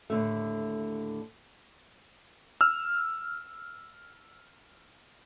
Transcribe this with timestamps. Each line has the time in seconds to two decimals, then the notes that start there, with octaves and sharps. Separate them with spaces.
0.10 D#2 A2 D3 D#3 A3
2.61 E6 F6